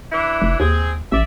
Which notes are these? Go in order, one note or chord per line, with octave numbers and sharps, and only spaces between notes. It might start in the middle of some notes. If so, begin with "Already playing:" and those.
E3 D4 E4
F1
D#2 C4 G#4
A1 D5 E5